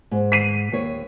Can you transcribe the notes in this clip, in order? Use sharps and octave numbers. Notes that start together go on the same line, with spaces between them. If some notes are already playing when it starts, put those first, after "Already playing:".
G#2
B6 C7 D#7
D#2 C#5